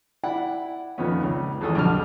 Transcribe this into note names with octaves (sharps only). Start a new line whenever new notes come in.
E4 D5 F#5 B5
F2 A#2 D#3 B3 C#4
C#2
G#1 E2 E3 A4 C#6 D#6
B1 F2 D3 G3 A5 F6